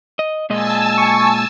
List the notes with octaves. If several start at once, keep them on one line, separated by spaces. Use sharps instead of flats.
D#5
A#2 G#3 D#5 G#5 A5 E6
C#6